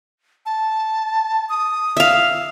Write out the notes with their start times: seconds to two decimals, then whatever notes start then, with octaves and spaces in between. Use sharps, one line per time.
0.46 A5
1.50 D#6
1.97 E5 F5